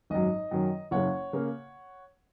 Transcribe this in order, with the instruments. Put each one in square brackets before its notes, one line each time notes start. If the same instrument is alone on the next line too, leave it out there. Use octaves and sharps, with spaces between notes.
[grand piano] G#1 F#2 F#3 D#5
F#2 D#3 F#3
F#1 F#2 C#3 C#5 F#5
C#3 A#3